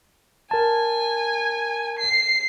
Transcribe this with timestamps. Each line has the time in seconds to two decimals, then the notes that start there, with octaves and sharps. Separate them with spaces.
0.51 A#4 G#5 A5
1.99 C7